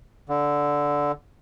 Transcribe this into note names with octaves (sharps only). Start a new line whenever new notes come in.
D3